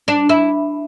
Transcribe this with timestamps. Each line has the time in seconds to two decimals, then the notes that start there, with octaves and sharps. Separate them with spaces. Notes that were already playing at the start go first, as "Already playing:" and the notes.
0.08 D4
0.29 E4